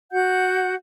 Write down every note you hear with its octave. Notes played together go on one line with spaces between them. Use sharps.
F#4 F#5 G6